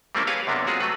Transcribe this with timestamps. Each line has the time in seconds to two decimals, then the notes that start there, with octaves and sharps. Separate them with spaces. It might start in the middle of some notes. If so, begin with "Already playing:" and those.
0.15 G3 A3 A#3 C4 C#4 E4
0.27 G4 G#4 B4 C#5 F5
0.47 F#2 C3 A#3 B3 D4
0.67 G#3 C4 F4 F#4 G#4
0.80 F#3 A3 B4